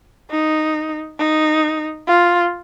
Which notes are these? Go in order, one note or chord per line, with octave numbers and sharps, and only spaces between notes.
D#4
D#4
F4